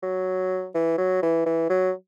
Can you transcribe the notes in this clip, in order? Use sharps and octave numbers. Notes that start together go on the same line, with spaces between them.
F#3
E3
F#3
E3
E3
F#3